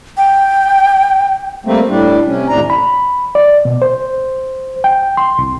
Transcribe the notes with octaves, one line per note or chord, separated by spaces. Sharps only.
G5
G3 A3 A#3 C4
A2 G3 D4
C3 C#4
D#2 A2 C3 D4 A#5
B5
D5
B2
C5
G5
C6
C2